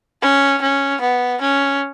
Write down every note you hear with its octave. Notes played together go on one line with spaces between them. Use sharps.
C#4
C#4
B3
C#4